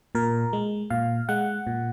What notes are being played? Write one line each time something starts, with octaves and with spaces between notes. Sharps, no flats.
A#2 A#4
G#3
A#2 F5
G#3 F#5
A#2